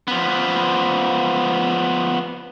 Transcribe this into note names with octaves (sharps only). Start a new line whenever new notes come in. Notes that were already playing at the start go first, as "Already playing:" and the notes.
F3 B3